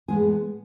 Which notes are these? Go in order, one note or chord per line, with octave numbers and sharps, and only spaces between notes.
A2 G#3 B3 G#4